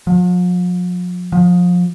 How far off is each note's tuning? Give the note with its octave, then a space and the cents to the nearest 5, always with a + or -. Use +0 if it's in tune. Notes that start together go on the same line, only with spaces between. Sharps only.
F3 +45
F3 +25